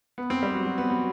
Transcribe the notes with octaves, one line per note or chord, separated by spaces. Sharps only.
B3
C4
G3
F#3
F#3
B3
F#3